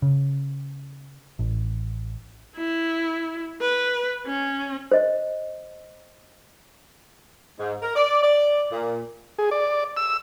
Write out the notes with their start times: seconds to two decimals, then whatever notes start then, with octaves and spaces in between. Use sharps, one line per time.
0.02 C#3
1.39 A1
2.56 E4
3.61 B4
4.26 C#4
4.92 C5 D#5
7.60 G#2
7.82 A#4
7.96 D5
8.22 D5
8.72 A#2
9.39 G#4
9.51 D5
9.97 E6